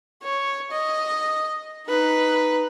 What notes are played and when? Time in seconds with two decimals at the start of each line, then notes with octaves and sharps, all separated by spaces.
0.23 C#5
0.71 D#5
1.87 D#4 B4